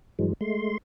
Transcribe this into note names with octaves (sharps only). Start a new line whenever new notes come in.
G2 E3 F#3 G#3
G#3 A3 C6